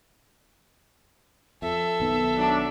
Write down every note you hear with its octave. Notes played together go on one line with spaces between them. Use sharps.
F2 A4 E5
B1 D#3 B3
F#3 D4